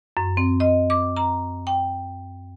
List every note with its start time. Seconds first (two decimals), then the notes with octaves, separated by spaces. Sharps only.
0.17 F#2
0.37 C4
0.60 D#5
0.90 D6
1.17 A#5
1.67 G5